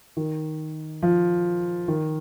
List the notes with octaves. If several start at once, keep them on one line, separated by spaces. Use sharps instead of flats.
D#3
F3
D#3